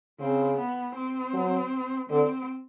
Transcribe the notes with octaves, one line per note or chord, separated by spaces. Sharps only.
C#3 C4
B3
C4
F#3
D3 C4